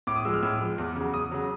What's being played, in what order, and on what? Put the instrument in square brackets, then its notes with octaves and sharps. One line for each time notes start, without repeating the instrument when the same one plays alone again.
[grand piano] A2 D6
D#6
F3 G#3 E6
F6
A2 E6
F3 G#3
E2
C#3 F#3
E2 D#6
C#3 F#3